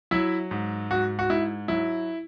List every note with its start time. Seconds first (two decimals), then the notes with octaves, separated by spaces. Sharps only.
0.11 F#3 E4 E5
0.51 G#2
0.91 G#2 F#4
1.19 F#4
1.30 G#2 E4
1.68 F#3 E4